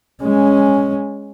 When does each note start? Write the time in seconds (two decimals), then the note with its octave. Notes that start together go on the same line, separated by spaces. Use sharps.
0.23 G#3 C#4